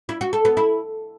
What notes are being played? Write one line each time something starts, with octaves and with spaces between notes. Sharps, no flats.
E4
F#4
A4
B3
E4